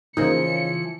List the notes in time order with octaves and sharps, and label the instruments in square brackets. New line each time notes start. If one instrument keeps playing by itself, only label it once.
[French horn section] C#3 [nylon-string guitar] E3 F3 [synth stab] A#3 D#4 [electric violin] C#7